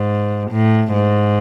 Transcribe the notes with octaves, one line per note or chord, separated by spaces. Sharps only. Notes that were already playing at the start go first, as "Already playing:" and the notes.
Already playing: G#2
A2
G#2